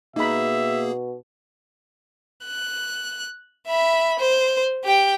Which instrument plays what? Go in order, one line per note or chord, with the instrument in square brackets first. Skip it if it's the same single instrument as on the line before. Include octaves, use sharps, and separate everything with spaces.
[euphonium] B2 [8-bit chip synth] A#3 G#4 [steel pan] D#4 B5 [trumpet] E5
[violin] F#6
E5 B5
C5
G4 G5